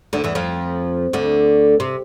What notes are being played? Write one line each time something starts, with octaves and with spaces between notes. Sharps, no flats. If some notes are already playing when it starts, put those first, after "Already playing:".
D2 D3
E2 E3
F2 F3
D2 D3
C3